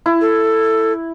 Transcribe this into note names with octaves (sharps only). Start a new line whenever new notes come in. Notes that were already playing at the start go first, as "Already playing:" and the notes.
E4
A4